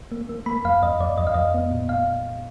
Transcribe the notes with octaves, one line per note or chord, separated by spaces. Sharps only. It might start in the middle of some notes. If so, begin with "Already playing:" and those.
A#3
A#3
A#3 B5
F2 F5
F2 D#5
F2 D5
F2 D#5
F5
F2 D#5
B3
A#2
A#2 F5